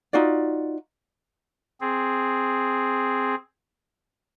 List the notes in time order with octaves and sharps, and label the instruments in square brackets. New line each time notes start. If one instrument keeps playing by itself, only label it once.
[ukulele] D#4 F4 F#4 D5
[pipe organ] C4 G#4